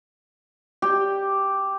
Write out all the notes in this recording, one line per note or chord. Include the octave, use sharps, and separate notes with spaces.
G4